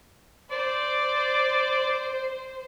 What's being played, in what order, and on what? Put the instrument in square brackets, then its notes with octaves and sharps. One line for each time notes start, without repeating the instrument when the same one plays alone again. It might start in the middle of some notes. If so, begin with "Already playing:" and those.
[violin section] C5 [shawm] D5